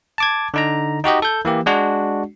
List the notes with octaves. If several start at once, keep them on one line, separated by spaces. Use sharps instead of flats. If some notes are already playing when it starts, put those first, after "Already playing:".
A5 D6 G#6
D3 D#4 A#5
D#4 F#4 G4 D#5
A4 G6
E3 A#3 G4
G#3 D4 F#4